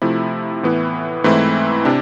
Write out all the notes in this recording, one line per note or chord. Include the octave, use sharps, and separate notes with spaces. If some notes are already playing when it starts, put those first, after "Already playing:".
C3 F3 A3 E4
A2 E3 B3 E4
G#2 E3 A3 C4 E4
C3 D4